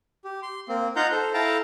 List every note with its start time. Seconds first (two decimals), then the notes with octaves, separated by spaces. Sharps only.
0.24 G4
0.43 C6
0.69 A#3 C4
0.96 D#4 F4 F5 F#5 A#5 G6
1.12 A4 C5
1.34 E4 A4 F5 G5 A5 A#5